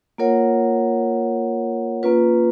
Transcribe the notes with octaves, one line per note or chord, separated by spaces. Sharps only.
A#3 F4 A#4 C#5 F#5
A#3 C#4 F4 B4